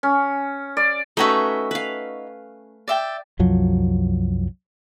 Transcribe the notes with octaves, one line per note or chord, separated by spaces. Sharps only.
C#4
D5
A3 C#4 D#4 F#4 B4 E5
B4 F5
D5 E5 G5
C2 F#2 F3 F#3